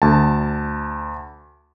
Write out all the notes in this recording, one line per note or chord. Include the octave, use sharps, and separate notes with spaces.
D2 A5